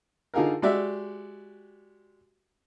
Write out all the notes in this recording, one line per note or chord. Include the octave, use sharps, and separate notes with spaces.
D3 D#4 F4 G#4 A#4
G#3 F#4 G4 D5 E5